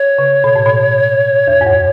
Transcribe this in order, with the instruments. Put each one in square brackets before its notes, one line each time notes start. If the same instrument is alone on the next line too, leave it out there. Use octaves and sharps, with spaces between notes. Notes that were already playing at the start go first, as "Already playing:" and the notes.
Already playing: [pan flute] C#5
[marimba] C#3
B2
A2
B2
E2
G#2
F#2